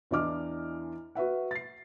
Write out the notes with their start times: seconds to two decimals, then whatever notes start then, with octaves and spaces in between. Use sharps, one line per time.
0.11 E2 E3 D4 D#5 D6 F6
1.15 F#4 B4 E5 F#5
1.51 A6 C7